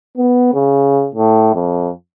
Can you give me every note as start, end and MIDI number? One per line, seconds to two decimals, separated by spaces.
0.17 0.53 59
0.54 1.09 49
1.15 1.54 45
1.54 1.90 41